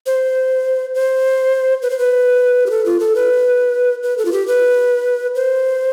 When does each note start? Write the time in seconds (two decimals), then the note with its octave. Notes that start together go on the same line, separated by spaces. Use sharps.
0.06 C5
0.95 C5
1.82 B4
1.90 C5
1.99 B4
2.66 G4
2.70 A4
2.86 F4
3.00 A4
3.15 B4
4.03 B4
4.18 A4
4.25 F4
4.32 G4
4.47 B4
5.35 C5